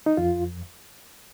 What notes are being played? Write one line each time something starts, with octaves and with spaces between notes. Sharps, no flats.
D#4
F2 F4